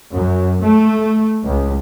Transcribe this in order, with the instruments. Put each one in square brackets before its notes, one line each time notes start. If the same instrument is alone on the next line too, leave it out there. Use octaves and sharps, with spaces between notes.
[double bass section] F#2
A3
C#2